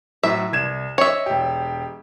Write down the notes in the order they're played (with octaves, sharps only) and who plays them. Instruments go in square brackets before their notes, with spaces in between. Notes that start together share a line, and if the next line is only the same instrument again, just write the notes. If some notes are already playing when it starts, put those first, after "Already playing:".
[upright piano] A2 F#3 [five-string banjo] E5
[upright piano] C2 G#6 E7
[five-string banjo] C#5 E5 [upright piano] D#5
[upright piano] E1 G4